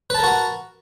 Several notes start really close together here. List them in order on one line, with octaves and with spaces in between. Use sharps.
B4 A5 A#4 F#4